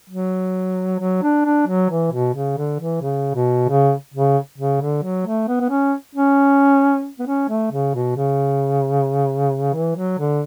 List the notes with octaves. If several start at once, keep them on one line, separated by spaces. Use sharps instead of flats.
F#3
F#3
D4
D4
F#3
E3
B2
C#3
D3
E3
C#3
B2
C#3
C#3
C#3
D3
F#3
A3
B3
B3
C#4
C#4
B3
C#4
A3
C#3
B2
C#3
E3
F#3
D3